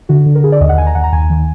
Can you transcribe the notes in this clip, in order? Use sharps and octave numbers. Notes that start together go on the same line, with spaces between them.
D3 F#4
D3
A#4
D3 G#4
D5
D#2 D#5
F#5
D#2 G#5
A#5
D#2 F#5
A#5
D#2 G#5
D#3